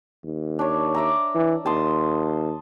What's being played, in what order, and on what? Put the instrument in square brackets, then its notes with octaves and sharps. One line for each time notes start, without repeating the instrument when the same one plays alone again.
[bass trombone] D#2
[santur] D4 C#5
D5 E5 A#5
[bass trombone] E3
[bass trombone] D#2 [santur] A5 C6 D#6